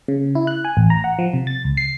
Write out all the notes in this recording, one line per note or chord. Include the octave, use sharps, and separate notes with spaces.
C#3
E4
F#6
G#5
A1
A#5
F#5
F3
C3
A6
C#2
C7